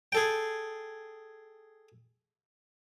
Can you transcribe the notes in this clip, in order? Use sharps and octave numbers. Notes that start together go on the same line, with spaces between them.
G#4 A4 G5